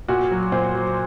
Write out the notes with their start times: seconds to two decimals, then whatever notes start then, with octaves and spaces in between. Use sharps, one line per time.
0.08 A#2 F#4
0.31 F#3
0.52 A#2 C5
0.75 F#3